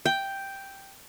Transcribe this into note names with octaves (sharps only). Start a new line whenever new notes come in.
G5